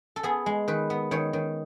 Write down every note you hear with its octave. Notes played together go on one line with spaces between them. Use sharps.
A4
B3 G#4
G#3
D#3 B4
B3
D#3 C#5
D#3